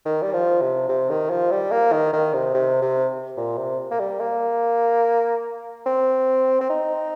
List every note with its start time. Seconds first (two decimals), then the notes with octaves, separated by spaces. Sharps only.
0.06 D#3
0.22 G3
0.33 F3
0.61 C3
0.89 C3
1.10 D#3
1.30 F3
1.51 G3
1.71 A#3
1.92 D#3
2.13 D#3
2.33 C3
2.54 C3
2.82 C3
3.37 A#2
3.58 C3
3.91 A#3
4.00 G3
4.20 A#3
5.86 C4
6.61 C4
6.70 D#4